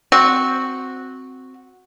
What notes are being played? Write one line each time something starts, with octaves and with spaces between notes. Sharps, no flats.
C4 F#4